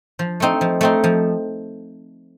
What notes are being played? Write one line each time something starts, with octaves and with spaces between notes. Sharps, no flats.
F3
A3 C4 D#4
F3
A3 C4 D#4
F3